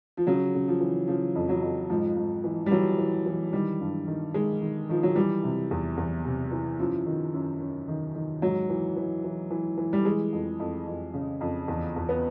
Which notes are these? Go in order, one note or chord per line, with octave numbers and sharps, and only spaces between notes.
F3
C#3 F#3
C#3
F3
E3
C#3 F3
F2
F#3
F2
G#2 F3
G#2
E3
G3
E3 F#3
E3
E3
D#3 G3
G2
D#3
D#3 G#3
D#3
D#3 F3
F#3
E3 G3
C3
E2
E2
C3
E3
F#2 F3
D#3
F#2
F#2
D#3
D#3
G#2 F#3
E3
E3
E3
E3
E3
G3
E3 G#3
F2
F2
F2
C#3
F2
E2
E2
B3